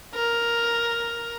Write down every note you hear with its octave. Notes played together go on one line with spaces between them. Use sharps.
A#4